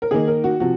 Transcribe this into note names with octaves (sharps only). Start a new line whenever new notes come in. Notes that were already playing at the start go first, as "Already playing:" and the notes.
A#4
D#3 A#3 D#4 G#4
A#4
F#4
C3 F3 F#4